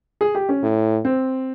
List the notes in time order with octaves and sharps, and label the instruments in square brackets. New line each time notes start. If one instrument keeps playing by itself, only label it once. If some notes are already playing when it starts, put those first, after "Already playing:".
[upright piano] G#4
G4
C#4
[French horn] A2
[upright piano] C4